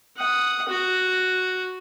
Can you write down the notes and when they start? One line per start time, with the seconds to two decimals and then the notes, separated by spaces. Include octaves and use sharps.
0.16 F#5 D#6
0.68 F#4